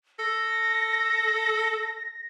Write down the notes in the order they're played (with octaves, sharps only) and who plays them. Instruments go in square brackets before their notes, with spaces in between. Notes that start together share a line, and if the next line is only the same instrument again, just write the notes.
[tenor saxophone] A4 [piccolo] A#6